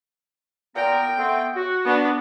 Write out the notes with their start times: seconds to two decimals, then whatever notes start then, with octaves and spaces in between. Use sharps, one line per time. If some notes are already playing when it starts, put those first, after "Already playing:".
0.76 A#2 B3 A#4 G5
1.17 A3 B3 C4
1.55 F#4
1.85 B3 D4